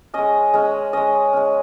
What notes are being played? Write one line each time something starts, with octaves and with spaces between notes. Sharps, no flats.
G#3 C#4 D#5
G#3 C#4
G#3 C#4 D#5
G#3 C#4